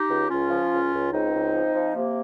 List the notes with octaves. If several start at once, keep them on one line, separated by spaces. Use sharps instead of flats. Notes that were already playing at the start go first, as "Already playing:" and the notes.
Already playing: D#4 G4
C#2
C#2 C#4 F4
F3
C#2
C#2
C#2 C4 D#4
C#2
F3
F3
C3 A#3